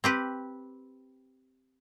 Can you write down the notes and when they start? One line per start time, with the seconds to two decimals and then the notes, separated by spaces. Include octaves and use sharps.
0.04 C4 G4 B4